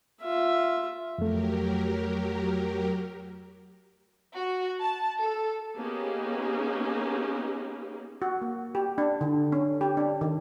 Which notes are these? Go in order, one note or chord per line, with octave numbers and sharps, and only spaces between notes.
F4 E5
F2 F#3 A3 G4 A#4
F#4
A5
A4
A#3 B3 C#4 D#4 G4 G#4
F#4
A#3
G4
D4
D3
C#4
G4
D4
D#3